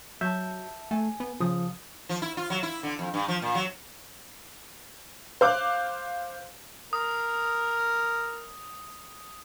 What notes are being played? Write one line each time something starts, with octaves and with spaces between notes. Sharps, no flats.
F#3 E5 A5 G6
A3 G#5
B3
C#3 F3 D#6
F3
E4
F4
F#3
E4
D3
F2
G2
F3
A#2
F#3
C5 F5 D6 F#6
A#4 D#6